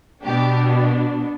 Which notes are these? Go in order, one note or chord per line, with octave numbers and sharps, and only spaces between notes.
B2 B3 D4 G4